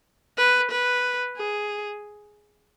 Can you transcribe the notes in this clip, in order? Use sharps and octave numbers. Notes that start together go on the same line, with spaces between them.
B4
B4
G#4